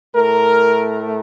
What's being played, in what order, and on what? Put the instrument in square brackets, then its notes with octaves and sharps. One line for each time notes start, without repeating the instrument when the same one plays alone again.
[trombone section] A2 A3 A#4